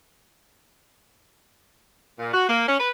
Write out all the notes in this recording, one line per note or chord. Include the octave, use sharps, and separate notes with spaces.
A#2
F#4
A#3
C#4
B4